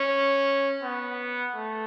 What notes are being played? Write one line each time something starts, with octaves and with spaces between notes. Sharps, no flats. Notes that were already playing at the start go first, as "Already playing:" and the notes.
Already playing: C#4
B3
A3